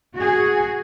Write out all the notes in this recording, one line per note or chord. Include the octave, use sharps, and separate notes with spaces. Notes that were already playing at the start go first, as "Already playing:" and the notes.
F#4 G#4